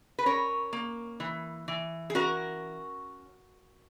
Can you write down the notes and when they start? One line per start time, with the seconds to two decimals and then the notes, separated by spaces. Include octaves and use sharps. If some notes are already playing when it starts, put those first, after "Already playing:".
0.19 B4
0.26 C#4 A#4 C#5
0.73 A#3
1.20 E3
1.68 E3
2.10 G#4
2.15 C#4 F#4 A#4